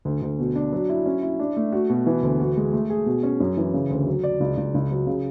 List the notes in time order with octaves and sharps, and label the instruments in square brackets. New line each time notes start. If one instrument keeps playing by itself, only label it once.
[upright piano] D2
D2
B2
D4
F#3
E4
C#4
E4
D4
A3
F#4
B2
E3
D2
F#4
G#3
A3
G#4
B2
C#4
F#2
E3
C#3
D2
F#3
D5
C#2
C#2
C#2
F#3
C#3